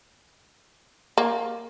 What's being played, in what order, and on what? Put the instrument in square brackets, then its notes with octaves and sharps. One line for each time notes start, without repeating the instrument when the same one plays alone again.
[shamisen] A#3